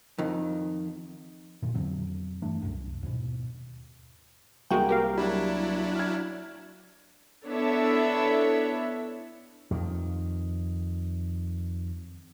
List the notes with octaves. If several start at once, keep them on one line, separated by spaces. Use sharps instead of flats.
F2 D#3
G1 F#2 A#2 D#3
F2 D3 F#3 C4
G2 E3 A3 D4
C2 F#2
D#2 G#2 B2
C2 G#3 A#3 F#4 G5
G4 A#4 F5
F#3 G3 D4 E4
F6 G#6
B3 D4 E4 A4 C#5 E5
F2 D#3